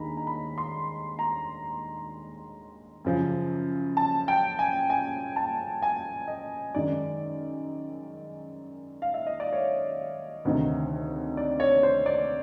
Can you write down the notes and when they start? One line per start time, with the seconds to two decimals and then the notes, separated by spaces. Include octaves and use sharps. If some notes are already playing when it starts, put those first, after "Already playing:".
Already playing: D#2 D#3 G#3 D4 A#5 B5
0.17 A#5
0.27 B5
0.58 C6
1.19 A#5
3.05 F#2 C#3 F3
3.97 A5
4.28 G5
4.59 G#5
4.90 G#5
5.36 A5
5.82 G#5
6.28 D#5
6.74 F#2 D#3 G#3 D5
9.02 F5
9.14 E5
9.27 D#5
9.40 D5
9.53 C#5
10.45 D2 C3 D#3
11.37 D5
11.60 C#5
11.83 C5
12.06 D5